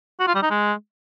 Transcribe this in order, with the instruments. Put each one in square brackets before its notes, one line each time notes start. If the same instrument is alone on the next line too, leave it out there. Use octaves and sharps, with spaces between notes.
[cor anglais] F#4
F4
G3
D#4
G#3